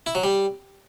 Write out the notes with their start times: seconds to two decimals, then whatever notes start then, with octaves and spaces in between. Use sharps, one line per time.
0.06 E4
0.15 F#3
0.23 G3